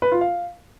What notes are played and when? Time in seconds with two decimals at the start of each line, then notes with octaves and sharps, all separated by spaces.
0.02 B4
0.12 F4
0.21 F5